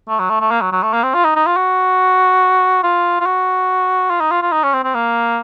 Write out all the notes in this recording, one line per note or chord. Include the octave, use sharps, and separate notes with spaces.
A3
F#3
A3
A3
A#3
F#3
F#3
A3
A#3
C4
F4
D#4
D#4
F4
F#4
F4
F4
F#4
F4
D#4
F4
F4
D#4
C#4
C4
C4
A#3